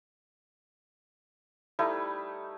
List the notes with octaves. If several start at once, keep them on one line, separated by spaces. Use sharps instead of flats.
G3 A3 D#4 E4